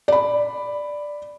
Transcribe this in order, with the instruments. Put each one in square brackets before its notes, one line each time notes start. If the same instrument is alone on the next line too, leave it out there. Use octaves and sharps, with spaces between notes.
[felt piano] D5 B5